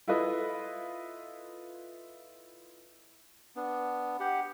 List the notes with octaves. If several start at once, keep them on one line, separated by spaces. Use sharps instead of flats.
E4 F4 A4 B4 D#5 E5
B3 D4
G4 F#5